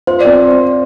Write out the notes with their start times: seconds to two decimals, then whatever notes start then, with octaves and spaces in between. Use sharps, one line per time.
0.07 F4 C5
0.21 C4 D5